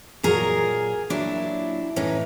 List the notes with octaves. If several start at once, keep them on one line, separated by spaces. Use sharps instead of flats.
A#2 F#3 G#4 A#4
A#2 F#3 D4 E4
A2 E3 C#4 D#4